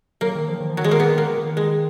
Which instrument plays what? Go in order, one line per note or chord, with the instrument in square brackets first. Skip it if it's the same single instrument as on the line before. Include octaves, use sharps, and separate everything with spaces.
[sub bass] F#3 [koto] A#3
[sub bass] D#3
F3
D#3
F3
[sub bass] D#3 [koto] F#3
[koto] G#3
A#3
B3
A#3
[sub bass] D#3
[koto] G#3